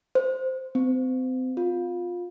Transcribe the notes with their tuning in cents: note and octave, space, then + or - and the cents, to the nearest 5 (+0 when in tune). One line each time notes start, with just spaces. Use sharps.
C5 -10
C4 -35
F4 +20